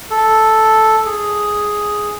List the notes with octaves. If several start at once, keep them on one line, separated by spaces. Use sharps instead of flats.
A4
G#4